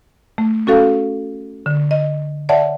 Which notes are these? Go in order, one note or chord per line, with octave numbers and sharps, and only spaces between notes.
A3
C#4 F#4 A4 F5
D3
D#5
C#5 D5 E5 F#5 A5